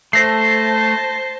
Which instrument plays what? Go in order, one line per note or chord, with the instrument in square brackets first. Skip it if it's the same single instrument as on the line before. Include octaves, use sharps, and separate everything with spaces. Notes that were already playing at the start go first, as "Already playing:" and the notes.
[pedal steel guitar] A3 [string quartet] C5 A5 [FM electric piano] A#6 C7